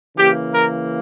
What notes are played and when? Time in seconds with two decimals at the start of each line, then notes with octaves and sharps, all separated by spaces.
0.16 C#3 E3 A#3 G4
0.54 A#4